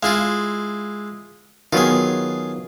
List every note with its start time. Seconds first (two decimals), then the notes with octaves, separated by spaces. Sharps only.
0.03 G#3 E4 F4 F5
1.73 D#3 F#3 B3 F4 G#4